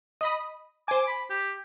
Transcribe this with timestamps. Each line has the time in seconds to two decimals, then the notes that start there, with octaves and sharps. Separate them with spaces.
0.21 D#5 B5 D#6
0.88 C5 G#5 D6
1.07 B5
1.30 G4